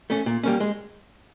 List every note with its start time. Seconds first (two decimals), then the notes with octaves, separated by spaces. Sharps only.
0.10 A3 C#4
0.26 A#2
0.43 G3 A#3 C#4
0.60 G#3